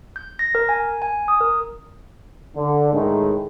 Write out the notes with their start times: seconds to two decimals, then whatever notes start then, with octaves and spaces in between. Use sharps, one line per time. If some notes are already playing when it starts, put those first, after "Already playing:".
0.16 G6
0.39 A#6
0.55 A#4
0.69 G#5
1.02 G#5
1.28 D#6
1.41 A#4
2.56 D3
2.93 A2 D#3 G#3